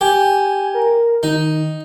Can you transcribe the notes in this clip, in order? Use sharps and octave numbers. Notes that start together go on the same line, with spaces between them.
G4 G#5
A#4
D#3 D#4